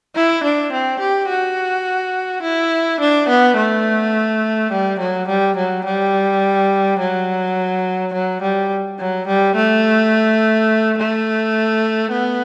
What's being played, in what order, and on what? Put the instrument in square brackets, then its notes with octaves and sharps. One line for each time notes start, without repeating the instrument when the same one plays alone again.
[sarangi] E4
D4
C4
G4
F#4
E4
D4
B3
A3
G3
F#3
G3
F#3
G3
F#3
F#3
G3
F#3
G3
A3
A3
B3